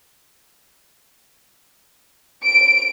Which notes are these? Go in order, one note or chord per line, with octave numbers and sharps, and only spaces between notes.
D7